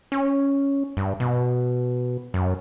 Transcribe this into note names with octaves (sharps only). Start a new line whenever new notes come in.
C#4
G2
B2
F#2